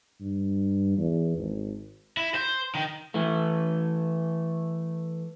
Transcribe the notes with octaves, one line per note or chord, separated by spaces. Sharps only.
G2
E2
G#1
E4
C5
D#3
E3 A3